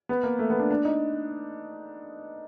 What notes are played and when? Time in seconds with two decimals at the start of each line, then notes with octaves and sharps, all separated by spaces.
0.09 B3
0.23 A#3
0.39 A3
0.50 B3
0.59 D4
0.70 D4
0.85 D#4